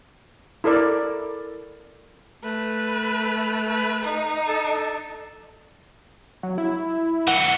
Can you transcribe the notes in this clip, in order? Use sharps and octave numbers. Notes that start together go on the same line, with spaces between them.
E4 A4 A#4 D5
A3 B4
B4
D#4
A4
F#3
E4
E3 F#3 F#5